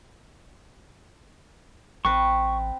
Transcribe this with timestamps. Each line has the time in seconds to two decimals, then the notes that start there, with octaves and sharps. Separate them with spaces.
2.05 A1 C4 B4 C#6